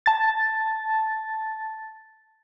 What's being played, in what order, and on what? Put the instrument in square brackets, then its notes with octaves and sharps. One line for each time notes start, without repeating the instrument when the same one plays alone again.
[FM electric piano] A5 A6